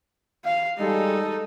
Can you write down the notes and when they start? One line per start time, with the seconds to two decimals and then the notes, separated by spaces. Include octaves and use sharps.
0.44 F5
0.78 G3 G#3 D#4 A4